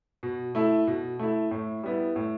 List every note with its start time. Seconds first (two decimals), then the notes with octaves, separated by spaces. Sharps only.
0.23 B2
0.55 A3 E4
0.87 B2
1.19 A3 E4
1.51 A2
1.83 G3 B3 E4
2.16 A2